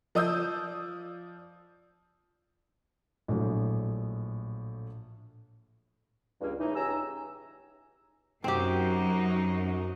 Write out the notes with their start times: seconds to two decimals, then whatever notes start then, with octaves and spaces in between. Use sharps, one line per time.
0.15 F3 D5 D#6 E6 G6
3.28 A#1 A2 F#3
6.41 C#2 G2 A#3 C#4
6.60 A2 E3 D#4
6.76 C#2 C#4 G4 G#5 A#5 E6
8.44 F#2 C4 D#4 F#4 G4